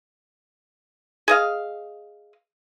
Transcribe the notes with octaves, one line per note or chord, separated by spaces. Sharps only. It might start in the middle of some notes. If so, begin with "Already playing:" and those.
G#4 D#5 F5